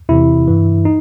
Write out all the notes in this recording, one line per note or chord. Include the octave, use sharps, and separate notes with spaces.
E2 C3 E3 E4
G2 E3
D#4